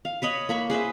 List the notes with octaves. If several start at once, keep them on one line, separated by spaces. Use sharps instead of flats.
F5
B4 C#5 D#5 B5
A#3 B5 C#6
G#4 B4 C5 E5